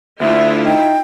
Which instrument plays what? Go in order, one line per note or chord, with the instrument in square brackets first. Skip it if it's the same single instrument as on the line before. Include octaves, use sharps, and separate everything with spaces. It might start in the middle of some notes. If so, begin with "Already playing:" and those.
[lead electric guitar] D2 [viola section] E4 F4 [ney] E5
[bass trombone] D#4 [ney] G5